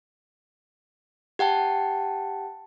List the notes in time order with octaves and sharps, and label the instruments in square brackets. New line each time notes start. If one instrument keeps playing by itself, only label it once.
[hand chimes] G4 F#5 G5 A5